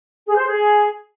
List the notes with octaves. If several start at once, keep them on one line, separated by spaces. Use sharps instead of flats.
G#4
C5
G#4